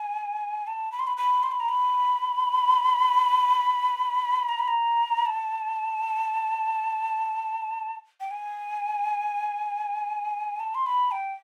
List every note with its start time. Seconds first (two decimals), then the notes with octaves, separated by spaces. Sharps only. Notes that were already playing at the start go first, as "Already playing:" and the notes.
Already playing: G#5
0.67 A5
0.92 B5
0.99 C6
1.07 B5
1.17 B5
1.43 C6
1.51 B5
1.60 A#5
1.69 B5
4.49 A#5
4.59 B5
4.68 A#5
5.26 A5
8.20 G5
8.31 G#5
10.60 A5
10.75 C6
10.86 B5
11.11 G5